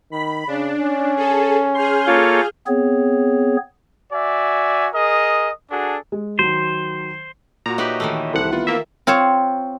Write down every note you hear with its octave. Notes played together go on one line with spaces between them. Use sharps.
D#3 B5
C#3 D4
C#4
G#4 A4
G#4 C6 F6 G6
A#3 F4 A4 C#5
B3 C4 G#4 C#5
F#4 D5 E5 G#5
G#4 A#4 D#5 D#6
D4 F#4 G#4 A4
G#3
D#3 F#3 C5
A#2 F#4 A#5
D#4 G4 B4 C#5 D#5 E5
D#3 E3 A3
C2 E4 A4 C5 F#5
B3 E4 F4
A#3 E5
C4 F4 C5 C#5